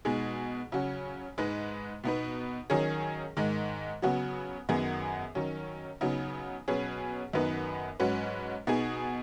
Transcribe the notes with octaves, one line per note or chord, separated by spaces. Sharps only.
B2 G#3 D#4 G#4
C#3 F#3 C#4 F#4
G#2 G#3 D#4 B4
B2 B3 D#4 B4
D#3 F#3 C#4 G#4
G#2 D#3 G#3
C#3 F#3 B3 F#4
F#2 D#3 B3 G#4
D#3 F#3 C#4
C#3 F#3 B3 D#4
B2 F#3 C#4 G#4 B4
F#2 D#3 B3 D#4 B4
G#2 F#3 C#4 F#4 B4
B2 B3 D#4 G#4